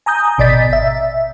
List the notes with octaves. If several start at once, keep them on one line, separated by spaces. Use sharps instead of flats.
G#5 A#5 D#6 G6
G#1 B2 D5 D#5 A6 B6
E5